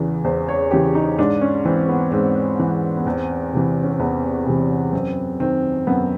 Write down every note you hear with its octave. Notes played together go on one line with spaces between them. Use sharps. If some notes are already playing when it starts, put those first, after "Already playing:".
Already playing: E2 C#3 E3
E2 C5
C#5
C#3 E3 G4
D#4
G#2 D4
C#4
E3 C4
B3
G#2 C4
E3
B3
E2 C4
C3 E3
C#4
C4
E2 B3
C3 E3
F#2 C4
D#3 C4
F#2 B3